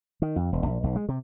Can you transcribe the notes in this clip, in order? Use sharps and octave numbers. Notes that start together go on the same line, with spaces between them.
D#3
F2
E1
A#1
B1
G#3
C3